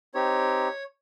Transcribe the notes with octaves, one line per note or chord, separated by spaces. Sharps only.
C4 D#4 G4 C#5